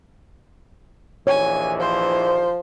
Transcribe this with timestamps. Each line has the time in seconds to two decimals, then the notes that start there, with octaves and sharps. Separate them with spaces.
1.27 A#1 D#2 E3 C#5 G#5
1.80 F3 C5